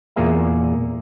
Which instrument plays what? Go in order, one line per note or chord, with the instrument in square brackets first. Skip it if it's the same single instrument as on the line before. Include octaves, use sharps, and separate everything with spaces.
[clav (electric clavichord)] E2 A#2 A#3 G#4 E5 A#5